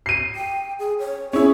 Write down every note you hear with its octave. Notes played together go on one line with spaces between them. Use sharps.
C7 D#7
G5
G#4
C#5
C#4 E4 G#4